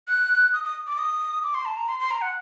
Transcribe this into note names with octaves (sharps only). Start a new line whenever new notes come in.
F#6
D#6
D#6
D6
D#6
D6
C6
A5
A#5
C6
C6
A#5
F#5